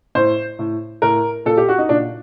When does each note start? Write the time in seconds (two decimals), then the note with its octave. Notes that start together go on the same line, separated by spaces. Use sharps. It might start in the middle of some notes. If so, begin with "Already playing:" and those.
0.15 A2 C5
0.59 A2
1.02 A2 A#4
1.46 A#2 A4
1.57 G4
1.69 F#4
1.78 D#4
1.89 A#2 D4